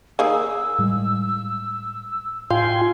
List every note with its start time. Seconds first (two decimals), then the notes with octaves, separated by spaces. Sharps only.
0.19 D#3 A#3 G#4 E6
0.79 A2 G3 G#3
2.50 A2 F4 F5 G5 G#5 C6